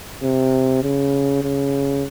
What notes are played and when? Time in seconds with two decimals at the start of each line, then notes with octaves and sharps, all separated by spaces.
0.23 C3
0.83 C#3
1.42 C#3